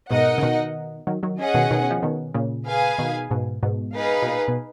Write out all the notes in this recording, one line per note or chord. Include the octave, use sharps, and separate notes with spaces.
G#2 B2 D#4 A#4 D#5 F#5
C#3
B2 D#3
D#3 F#3
D#3 F#3
C#4 G#4 D#5 F#5
B2 D#3
B2 D#3
F3
B2 D#3
A#2 C#3
G#4 B4 F5 G#5
B2 D#3
G#2 B2
G#2 B2
D#4 G#4 B4 F5
B2
A#2
B2